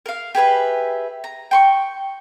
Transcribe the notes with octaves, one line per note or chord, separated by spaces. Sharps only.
A#4 F5
G4 G#4 B4 E5
A#5
G5 C6 C#6